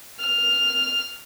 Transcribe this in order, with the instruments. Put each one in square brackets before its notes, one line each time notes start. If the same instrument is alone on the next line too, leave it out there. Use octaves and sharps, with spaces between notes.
[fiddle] F6